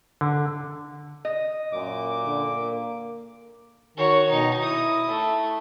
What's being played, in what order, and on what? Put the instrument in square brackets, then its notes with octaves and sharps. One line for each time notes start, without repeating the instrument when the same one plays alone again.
[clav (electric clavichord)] D3
[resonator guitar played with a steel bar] D#5
[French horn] F#2 [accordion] A#2 D6
[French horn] D3
A#3
[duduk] D#3 [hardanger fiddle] F#4 C#5
[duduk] B2 [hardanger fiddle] D#4
[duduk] E4 [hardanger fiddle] D#6
[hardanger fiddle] A3